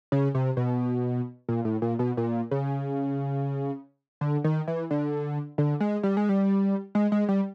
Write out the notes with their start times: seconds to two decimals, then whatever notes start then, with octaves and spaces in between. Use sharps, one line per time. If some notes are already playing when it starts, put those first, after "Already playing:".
0.12 C#3
0.35 C3
0.57 B2
1.49 A#2
1.65 A2
1.82 A#2
1.99 B2
2.17 A#2
2.51 C#3
4.21 D3
4.44 D#3
4.68 E3
4.91 D3
5.58 D3
5.80 G#3
6.03 G3
6.17 G#3
6.29 G3
6.95 G#3
7.12 G#3
7.29 G3